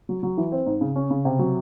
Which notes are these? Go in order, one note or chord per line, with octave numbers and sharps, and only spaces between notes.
F#3
F#3
E3
C4
G#2
C#3
C#4
C#3
C3
F#3